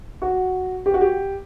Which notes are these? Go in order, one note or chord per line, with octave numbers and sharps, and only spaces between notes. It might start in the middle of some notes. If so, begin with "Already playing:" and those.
F#4
G4
F#4
G4